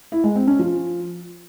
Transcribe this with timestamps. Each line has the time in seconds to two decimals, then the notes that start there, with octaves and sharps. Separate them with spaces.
0.12 E4
0.24 G#3
0.36 C4
0.47 C#4
0.59 F3